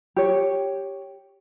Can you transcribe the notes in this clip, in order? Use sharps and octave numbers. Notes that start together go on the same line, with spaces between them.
G4 C#5